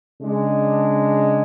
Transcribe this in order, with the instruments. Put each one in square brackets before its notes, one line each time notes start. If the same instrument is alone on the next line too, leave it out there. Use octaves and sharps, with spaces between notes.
[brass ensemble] C#3 G#3 D4